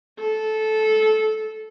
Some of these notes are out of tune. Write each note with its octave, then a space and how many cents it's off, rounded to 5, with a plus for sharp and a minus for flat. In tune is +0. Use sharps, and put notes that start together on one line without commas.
A4 -15